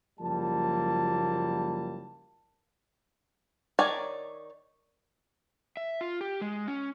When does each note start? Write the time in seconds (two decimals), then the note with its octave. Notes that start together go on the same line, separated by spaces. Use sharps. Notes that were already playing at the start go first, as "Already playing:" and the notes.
0.20 F#1 F3 G3 A#3 A5
3.79 D#3 C#5 D5 G#5 A#5
5.77 E5
6.01 F4
6.21 G4
6.41 G#3
6.68 C#4